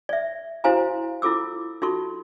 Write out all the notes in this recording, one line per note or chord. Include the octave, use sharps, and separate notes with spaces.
D5 E5
E4 F#4 C5 F5 G#5 A#5
E4 F4 A4 D6 E6
D#4 F4 F#4 A4 C#6